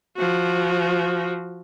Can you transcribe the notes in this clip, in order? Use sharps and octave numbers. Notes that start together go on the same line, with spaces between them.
F3 F#4